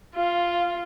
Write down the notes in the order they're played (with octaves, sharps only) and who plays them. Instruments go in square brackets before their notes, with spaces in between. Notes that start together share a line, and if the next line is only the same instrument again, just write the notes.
[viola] F4 [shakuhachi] F5